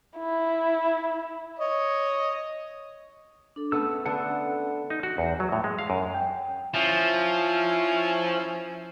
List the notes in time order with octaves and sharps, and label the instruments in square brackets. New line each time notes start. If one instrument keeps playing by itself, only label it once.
[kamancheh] E4
[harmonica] C#5 D#5
[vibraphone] D4 A4
[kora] A3 B3 [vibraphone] C#4 B4 [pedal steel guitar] E6
[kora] D3 B3 D4 [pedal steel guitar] F#5
[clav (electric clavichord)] D#4
F#4
E2
F#3
A2
G#3
F5
F#2
[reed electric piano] G5
[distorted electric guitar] F3 [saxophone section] C#4 E4